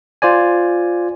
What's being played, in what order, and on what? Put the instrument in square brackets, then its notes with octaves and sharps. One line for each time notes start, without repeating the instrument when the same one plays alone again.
[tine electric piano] F4 C5 D5 G#5